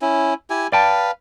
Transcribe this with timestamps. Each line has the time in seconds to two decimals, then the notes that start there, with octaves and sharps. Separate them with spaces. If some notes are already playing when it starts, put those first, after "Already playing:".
0.02 C#4 E4
0.50 E4 G4 G#5
0.72 B4 D5 F5 G5 A5